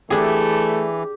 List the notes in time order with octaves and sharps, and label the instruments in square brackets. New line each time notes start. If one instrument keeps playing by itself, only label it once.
[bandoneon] E3 [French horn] A3 [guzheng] D4 G#4 [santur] G4